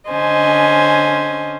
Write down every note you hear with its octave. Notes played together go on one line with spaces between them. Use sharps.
D3 C#4 C5 D#5 G#5